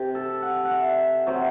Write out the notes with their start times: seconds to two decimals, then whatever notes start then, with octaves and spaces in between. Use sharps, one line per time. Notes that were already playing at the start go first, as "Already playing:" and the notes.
Already playing: C3
0.15 A4
0.42 F#5
0.65 F#5
0.71 E5
1.27 C3 F#3